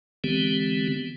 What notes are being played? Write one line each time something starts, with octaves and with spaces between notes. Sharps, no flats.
D3 E3 G#3 B3 C4 G4